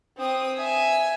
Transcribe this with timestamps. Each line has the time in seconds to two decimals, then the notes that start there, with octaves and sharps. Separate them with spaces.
0.18 C4 D#6
0.57 E5 G#5